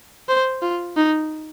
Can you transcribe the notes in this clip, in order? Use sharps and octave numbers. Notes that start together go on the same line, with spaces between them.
C5
F4
D#4